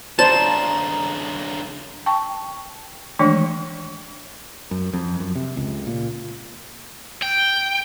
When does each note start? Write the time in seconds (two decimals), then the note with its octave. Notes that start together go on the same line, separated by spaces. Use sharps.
0.19 G2 C#3 C5 D5 A5 A#5 E7
2.06 G5 A5 C#6
3.19 D#3 E3 G#3 A3 D4
4.71 F#2
4.93 F2
5.20 F#2
5.35 C3
5.57 C#2
5.87 A#2
7.23 G5